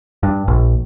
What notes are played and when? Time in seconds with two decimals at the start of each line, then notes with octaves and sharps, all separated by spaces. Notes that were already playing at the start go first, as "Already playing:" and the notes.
0.23 G2
0.48 A#1